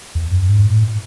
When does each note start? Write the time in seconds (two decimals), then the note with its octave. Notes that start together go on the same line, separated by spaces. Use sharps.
0.15 E2
0.31 F#2
0.49 G#2
0.66 A2